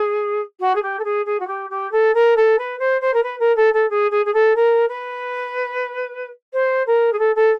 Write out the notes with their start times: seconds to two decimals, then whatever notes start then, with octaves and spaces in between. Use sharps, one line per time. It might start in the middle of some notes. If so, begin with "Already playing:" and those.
Already playing: G#4
0.60 F#4
0.75 G#4
0.82 G4
0.99 A4
1.04 G#4
1.25 G#4
1.39 F#4
1.47 G4
1.70 G4
1.91 A4
2.14 A#4
2.36 A4
2.58 B4
2.79 C5
3.01 C5
3.13 A#4
3.23 B4
3.39 A#4
3.56 A4
3.73 A4
3.90 G#4
4.11 G#4
4.25 G#4
4.33 A4
4.55 A#4
4.88 B4
6.53 C5
6.86 A#4
7.12 G#4
7.18 A4
7.35 A4